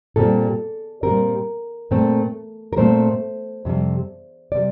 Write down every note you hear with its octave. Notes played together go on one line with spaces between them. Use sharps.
A#2 G3 C4 A4
A#2 G3 C4 A#4
A#2 A3 C4
A#4
A#2 A3 C4 C5
F2 C3 G3
C3 G3 D5